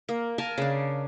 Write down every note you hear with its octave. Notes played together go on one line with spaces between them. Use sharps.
A#3
A#4 G#5 A5
C#3 D4